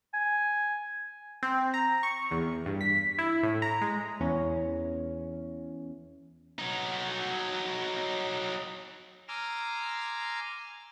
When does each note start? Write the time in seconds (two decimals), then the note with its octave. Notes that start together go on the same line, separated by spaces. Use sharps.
0.14 G#5
1.43 C4
1.74 A#5
2.03 C#6
2.31 E2
2.66 G2
2.81 B6
3.18 E4
3.43 A2
3.62 A#5
3.81 G#3
4.20 E2 C#4
6.58 F#3 D#4
9.28 G#5 A#5 C6 D6 E6 F6